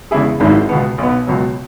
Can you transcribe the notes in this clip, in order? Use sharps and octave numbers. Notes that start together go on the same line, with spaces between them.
E2 C#3 G#3 E4 G#4
G#1 G#2 F#3 E4 G#4
C#2 B2 B3
B1 B2 B3
C#2 B2 F#3